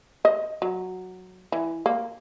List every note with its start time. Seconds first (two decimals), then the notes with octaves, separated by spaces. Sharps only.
0.25 D#5
0.62 F#3
1.52 E3
1.86 A#3